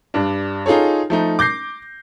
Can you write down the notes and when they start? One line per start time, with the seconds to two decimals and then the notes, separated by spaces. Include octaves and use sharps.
0.14 G2 D4
0.66 D#4 F4 G#4 A4 C#5
1.10 F3 A3 D#4
1.39 D6 G6 A#6 C7